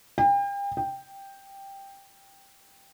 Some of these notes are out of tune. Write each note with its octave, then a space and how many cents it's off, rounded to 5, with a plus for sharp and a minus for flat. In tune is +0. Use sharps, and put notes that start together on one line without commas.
G5 +40
G5 +5